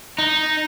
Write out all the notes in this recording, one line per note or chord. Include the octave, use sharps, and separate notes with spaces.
D#4